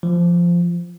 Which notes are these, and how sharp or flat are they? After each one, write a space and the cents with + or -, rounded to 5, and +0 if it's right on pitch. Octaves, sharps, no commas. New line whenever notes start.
F3 -10